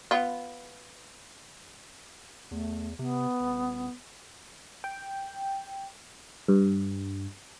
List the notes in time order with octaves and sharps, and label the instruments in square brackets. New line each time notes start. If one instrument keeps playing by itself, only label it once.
[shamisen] B3 F4
[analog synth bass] E2 [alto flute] A3
[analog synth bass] C3 [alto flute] B3
[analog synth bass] D#1
[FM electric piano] G5
G2